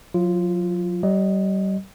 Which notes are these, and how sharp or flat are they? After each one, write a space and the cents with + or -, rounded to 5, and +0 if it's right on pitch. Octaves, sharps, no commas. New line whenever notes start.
F#3 -40 F4 -10
G3 -35 D#5 +0